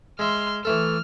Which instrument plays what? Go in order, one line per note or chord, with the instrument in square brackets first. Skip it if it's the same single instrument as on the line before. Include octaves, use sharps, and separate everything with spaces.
[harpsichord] G#3 E5 [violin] C6 F6
[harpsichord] E3 A3 A4 [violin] F6